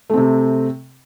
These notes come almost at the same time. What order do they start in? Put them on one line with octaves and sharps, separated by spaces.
A3 C4 C3